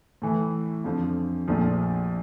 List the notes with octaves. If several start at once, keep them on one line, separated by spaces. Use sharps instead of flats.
A2 E3 A3
F2 D3 F3
A#1 A#2 F3 A3